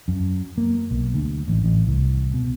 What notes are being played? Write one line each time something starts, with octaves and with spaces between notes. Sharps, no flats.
F#2
A#3
B1
D2
A1
A1
C2
B2